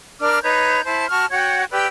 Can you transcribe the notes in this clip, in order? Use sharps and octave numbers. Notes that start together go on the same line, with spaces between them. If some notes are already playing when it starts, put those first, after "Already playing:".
D4 A#4 D6 F6
D#4 B4 C#5 G6
E4 C5 A5
F#4 A5 C#6 F6
F#4 C#5 F#5 G5
G4 B4 D5 E6